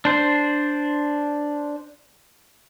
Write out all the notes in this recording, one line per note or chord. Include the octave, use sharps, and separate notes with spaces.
D4 C5